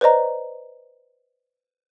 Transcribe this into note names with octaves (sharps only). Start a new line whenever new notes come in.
B4 C5 D5 D#5 A#5